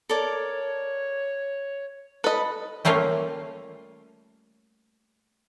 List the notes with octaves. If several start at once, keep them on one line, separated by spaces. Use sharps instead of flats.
A4 A#4 C#5 D5
A4 B4 D#5 B5
G3 A3 A#3 C#4 F4